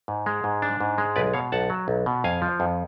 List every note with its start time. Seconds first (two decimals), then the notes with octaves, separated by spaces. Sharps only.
0.08 G#2
0.26 G#3
0.44 G#2
0.62 D4
0.81 G#2
0.98 G#3
1.16 B1 B4 D5
1.34 B2 C#5 F5
1.52 B1 F#5 A5
1.70 F#3
1.88 B1
2.06 B2
2.24 F2 F5 G#5
2.42 F3
2.60 F2